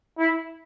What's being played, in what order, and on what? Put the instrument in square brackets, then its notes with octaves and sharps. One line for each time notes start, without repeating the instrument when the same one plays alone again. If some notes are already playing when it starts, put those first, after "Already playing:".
[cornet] E4